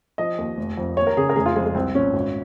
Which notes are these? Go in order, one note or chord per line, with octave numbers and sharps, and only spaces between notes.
F3 D#5
D#2
F1
F2
D#2 C#5
A#4
C#3 G#4
A#4
F1 G#4
F4
F2 G#3
G#3
C2 C4
A#2 C#4
G#1